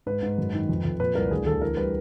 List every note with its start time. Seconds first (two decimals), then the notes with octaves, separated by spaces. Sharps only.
0.06 G#2 B4
0.22 G#2
0.38 F#2
0.54 D#3
0.69 F2
0.85 F2
1.00 A#2 B4
1.15 C2 A#4
1.31 D2 G#4
1.46 D2 A4
1.62 E3 A#4
1.77 G3 B4